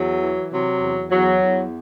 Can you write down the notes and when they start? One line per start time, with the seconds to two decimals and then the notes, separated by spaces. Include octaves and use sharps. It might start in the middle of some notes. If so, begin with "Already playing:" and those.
Already playing: E2 F#3
0.22 E3
0.51 C3 F#3
0.81 E2
1.10 E2 F#3
1.40 E2